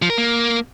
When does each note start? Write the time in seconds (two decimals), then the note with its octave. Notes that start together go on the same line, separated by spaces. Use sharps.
0.02 F3
0.10 A#4
0.18 A#3